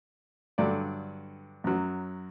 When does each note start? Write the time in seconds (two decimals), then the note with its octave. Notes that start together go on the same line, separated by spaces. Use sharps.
0.58 G2 D3 F#3 D5
1.64 F#2 F#3